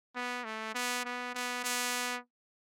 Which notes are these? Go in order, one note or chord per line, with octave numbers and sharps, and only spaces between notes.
B3
A3
B3
B3
B3
B3